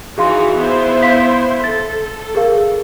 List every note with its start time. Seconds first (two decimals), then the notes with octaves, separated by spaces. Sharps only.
0.18 E3 D#4 F#4 G#4 F5 C6
0.59 B3 E4 C5
1.03 F5 B6
1.64 A4 A6
2.35 G#4 A#4 F5